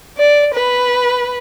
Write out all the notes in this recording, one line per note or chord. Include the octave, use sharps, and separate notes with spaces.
D5
B4